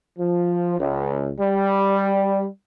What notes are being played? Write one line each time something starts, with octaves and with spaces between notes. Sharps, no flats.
F3
C#2
G3